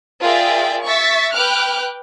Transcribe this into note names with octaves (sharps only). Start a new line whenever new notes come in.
F4 G#4 A#4 D5 E5 G5
E5 C#6 A6 B6
B4 G5 D6 F6 F#6